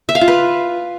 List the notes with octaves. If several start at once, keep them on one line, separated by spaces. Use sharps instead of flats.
E5
F5
F4
B4